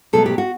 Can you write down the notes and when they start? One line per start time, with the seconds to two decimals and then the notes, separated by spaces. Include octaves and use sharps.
0.13 B2 F#3 A3 A4
0.26 G4
0.38 F#4